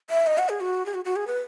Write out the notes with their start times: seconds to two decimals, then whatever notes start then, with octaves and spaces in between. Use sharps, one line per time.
0.10 E5
0.27 D#5
0.38 F#5
0.49 G#4
0.60 F#4
0.86 G#4
0.94 F#4
1.05 F#4
1.16 G#4
1.27 B4